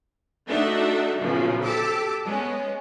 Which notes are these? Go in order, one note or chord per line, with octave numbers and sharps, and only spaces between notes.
A3 D4 D#4 F#4 E5 F#5
B1 A#2 C#3 F3
G4 A4 A5 D6 E6
G#3 B3 C#4